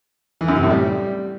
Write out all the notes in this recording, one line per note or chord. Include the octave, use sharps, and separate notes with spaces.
E3
F#2
C3
A2
G3